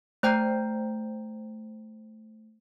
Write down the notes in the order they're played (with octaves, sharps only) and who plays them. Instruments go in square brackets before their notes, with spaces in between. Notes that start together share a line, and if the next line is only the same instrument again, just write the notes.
[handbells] A3 C5 G5 A#5 G6